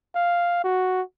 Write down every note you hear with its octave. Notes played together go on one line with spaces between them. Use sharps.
F5
F#4